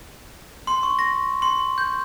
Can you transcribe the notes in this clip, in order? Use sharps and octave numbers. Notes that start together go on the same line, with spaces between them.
C6
C#6
A#6
C6
G6